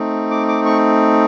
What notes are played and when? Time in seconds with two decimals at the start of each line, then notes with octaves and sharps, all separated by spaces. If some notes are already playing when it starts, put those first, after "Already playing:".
Already playing: A3 C4 D#4
0.31 D6
0.48 D6
0.66 C#6